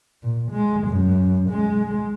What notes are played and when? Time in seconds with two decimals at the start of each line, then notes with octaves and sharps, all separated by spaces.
0.23 A#2
0.51 G#3
0.87 F#2
1.50 G#3